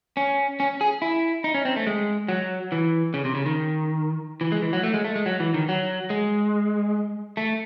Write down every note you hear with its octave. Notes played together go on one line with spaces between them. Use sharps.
C#4
C#4
G#4
E4
D#4
C#4
C4
A3
G#3
F#3
E3
C#3
C3
C#3
D#3
E3
G#3
E3
F#3
A3
G#3
A3
G#3
F#3
E3
D#3
F#3
G#3
A3